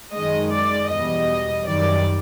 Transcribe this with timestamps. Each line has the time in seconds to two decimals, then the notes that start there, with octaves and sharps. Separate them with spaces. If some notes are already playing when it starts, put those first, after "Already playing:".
0.13 F#2 D#3 G#3 D#5
0.52 D5
0.89 E2 B2 G3 D#5
1.65 F#2 D#3 G3 D5